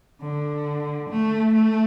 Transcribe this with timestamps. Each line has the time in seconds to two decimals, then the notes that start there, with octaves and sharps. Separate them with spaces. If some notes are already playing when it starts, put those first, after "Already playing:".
0.21 D3
1.10 A3
1.54 A3